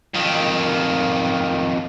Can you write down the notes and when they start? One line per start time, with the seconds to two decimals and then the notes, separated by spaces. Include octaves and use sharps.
0.14 F2 D#3